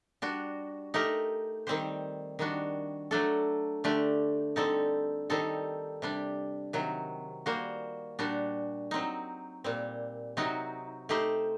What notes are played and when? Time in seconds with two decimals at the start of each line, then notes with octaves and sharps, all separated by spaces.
0.22 G3 D4 F#4
0.94 A3 D#4 G4 A#4
1.67 D#3 G3 C4 G4 C5
2.39 D#3 G3 D4 F#4
3.11 F#3 A3 D4 A4
3.84 D3 A3 D4 G4
4.56 D3 G3 C4 D#4 A4
5.30 D#3 G3 C4 D#4 A4
6.02 C3 G3 D4
6.73 C3 D#3 F#3
7.46 G3 A#3 F#4 C5
8.19 A#2 G3 D4 F#4
8.91 F#3 C4 D#4
9.64 A#2 G3 C4
10.37 C3 F#3 C4 D#4 F#4
11.09 A3 D#4 G4 C5